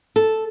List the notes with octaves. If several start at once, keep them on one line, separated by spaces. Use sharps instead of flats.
A4